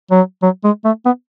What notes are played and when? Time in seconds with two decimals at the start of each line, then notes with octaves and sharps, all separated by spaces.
0.11 F#3
0.42 F#3
0.64 G#3
0.84 A3
1.06 B3